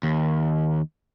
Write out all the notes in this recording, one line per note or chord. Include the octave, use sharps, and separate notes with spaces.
D#2